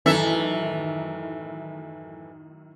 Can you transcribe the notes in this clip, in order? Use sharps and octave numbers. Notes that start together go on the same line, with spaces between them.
F#2 A2 D#3 E3 A4 E5